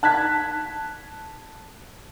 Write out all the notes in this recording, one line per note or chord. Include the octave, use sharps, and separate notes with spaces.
A5 F#6 G#6 B6